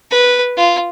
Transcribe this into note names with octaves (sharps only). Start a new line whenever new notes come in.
B4
F4